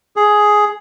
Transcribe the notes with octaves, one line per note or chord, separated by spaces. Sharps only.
G#4